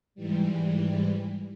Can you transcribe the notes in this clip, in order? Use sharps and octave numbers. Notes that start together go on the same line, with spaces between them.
G#2 E3 G3